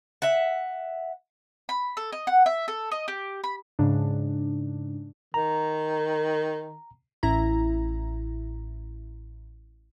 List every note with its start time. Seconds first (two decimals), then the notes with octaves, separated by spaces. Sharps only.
0.22 E5 F#5
1.69 B5
1.97 A4
2.12 D#5
2.27 F#5
2.46 E5
2.68 A4
2.91 D#5
3.08 G4
3.44 B5
3.79 G#2 C#3 D4
5.34 D#3 A#5
7.23 A1 E4 A#5